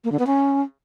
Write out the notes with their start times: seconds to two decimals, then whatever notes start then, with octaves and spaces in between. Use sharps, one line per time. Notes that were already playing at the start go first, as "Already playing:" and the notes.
0.04 A#3
0.12 D3
0.19 B3
0.26 C#4